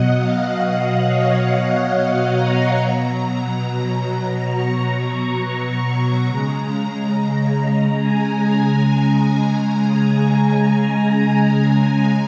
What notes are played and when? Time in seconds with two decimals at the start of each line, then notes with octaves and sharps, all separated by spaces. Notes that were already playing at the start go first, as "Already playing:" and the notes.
Already playing: B2 F#3 D#5 F#5
0.17 F5
0.60 D#5
1.04 C#5
1.47 F5
1.90 F5
2.34 A#5
2.78 B2 F#3
4.52 C#6
6.26 C#3 G#3 A#5
8.01 G#5